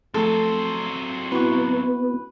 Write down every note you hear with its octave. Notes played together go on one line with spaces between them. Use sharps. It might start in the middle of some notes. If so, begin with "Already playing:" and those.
D#3 F3 F#3 A3 C4 A4 A5
B3 E4 F#4 B4 C#6